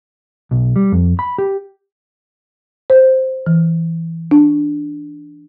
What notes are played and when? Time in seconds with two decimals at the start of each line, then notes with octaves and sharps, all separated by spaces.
0.51 B1
0.76 G3
0.92 F2
1.19 B5
1.38 G4
2.90 C5
3.47 E3
4.31 D4